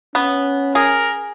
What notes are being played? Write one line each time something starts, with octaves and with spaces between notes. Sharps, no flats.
B3 C#4
G#4 A#4